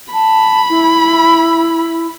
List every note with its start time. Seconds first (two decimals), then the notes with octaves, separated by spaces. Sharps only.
0.13 A5 B5
0.70 E4